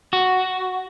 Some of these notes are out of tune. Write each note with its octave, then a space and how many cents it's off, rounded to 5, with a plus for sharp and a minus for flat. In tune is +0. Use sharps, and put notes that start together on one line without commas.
F#4 +5